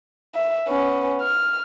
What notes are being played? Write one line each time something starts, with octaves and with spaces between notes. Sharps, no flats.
E5
B3 C#4
F6